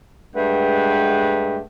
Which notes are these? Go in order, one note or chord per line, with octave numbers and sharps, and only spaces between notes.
G2 G#3 A3 B4 F#5 G5